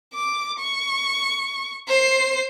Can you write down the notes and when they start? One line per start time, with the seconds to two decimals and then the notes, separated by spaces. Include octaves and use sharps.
0.14 D6
0.60 C#6
1.88 C5 C7